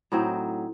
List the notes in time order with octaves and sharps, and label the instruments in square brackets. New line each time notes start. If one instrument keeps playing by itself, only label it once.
[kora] A2 F#3 C4 D#4